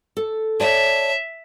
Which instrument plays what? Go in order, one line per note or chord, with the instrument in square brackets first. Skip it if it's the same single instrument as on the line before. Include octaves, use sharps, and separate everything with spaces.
[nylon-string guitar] A4
[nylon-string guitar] C#5 D5 A5 [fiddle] E5